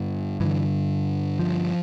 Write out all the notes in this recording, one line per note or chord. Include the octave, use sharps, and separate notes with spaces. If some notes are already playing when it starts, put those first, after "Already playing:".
Already playing: G2 D3
G2 D3 E3
F3